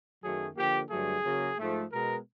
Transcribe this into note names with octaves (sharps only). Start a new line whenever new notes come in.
F#2 D#3 F#3 A3 G#4
D3 F3 A#3 G4
G2 D3 F#3 A3 G#4
C#3 F#3 A#3
G#2 F3 A3
B2 G#3 B3 A#4